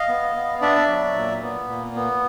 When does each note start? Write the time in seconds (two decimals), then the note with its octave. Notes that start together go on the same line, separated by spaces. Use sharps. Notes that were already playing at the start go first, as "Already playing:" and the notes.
Already playing: D#5 F5
0.09 B3
0.35 B3
0.61 D4 D5 E5
0.88 F#3
1.15 A#2
1.42 B3
1.68 A#2
1.95 B3